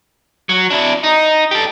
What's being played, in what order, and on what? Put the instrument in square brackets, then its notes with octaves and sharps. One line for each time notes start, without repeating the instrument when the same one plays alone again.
[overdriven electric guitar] F#3
D4 E4
D#4
G4 A4